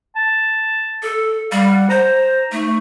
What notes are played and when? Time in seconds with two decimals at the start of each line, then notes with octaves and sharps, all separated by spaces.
0.16 A5
1.03 A4
1.52 G3 F5
1.67 F#5
1.90 C5 A#5
2.52 A3 D#4